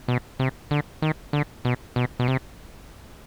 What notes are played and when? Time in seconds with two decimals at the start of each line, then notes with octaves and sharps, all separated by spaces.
0.08 B2
0.40 C3
0.71 D3
1.02 D#3
1.33 D3
1.65 B2
1.96 B2
2.20 B2
2.28 C3